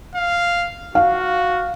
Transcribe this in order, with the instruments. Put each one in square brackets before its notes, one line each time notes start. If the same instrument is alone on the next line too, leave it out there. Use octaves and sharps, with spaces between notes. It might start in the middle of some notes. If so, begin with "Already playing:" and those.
[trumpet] F5
[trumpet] F#4 [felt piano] F5